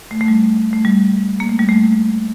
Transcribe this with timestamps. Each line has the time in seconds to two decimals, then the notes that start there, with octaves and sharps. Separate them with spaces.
0.11 A3
0.21 A3
0.28 G3
0.73 A3
0.85 G3
1.40 A#3
1.49 A3
1.59 G3
1.69 A3